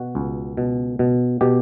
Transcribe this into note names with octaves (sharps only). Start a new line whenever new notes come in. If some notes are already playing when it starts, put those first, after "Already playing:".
Already playing: B2 F#4
C#2
B2
B2
B2 G4